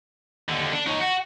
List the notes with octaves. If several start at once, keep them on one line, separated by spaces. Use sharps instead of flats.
D#2 D3
D4
D#4 C#5
F#4